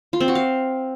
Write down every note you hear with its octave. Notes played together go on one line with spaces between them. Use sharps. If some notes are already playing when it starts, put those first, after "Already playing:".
F4
C4
F#4
F5